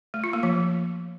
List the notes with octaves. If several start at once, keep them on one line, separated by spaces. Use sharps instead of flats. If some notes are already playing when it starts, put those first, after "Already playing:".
A3
F4
A#3
F3